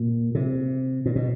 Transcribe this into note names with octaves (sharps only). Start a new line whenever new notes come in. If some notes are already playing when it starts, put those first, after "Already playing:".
Already playing: A#2
C3
A#2
B2